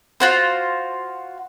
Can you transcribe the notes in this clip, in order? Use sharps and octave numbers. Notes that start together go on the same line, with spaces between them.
F4 F#4 C5